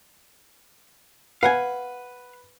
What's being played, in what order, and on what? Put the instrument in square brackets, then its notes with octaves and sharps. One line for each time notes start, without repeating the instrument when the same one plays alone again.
[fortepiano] B4 [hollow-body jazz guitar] F5 F#5 G#5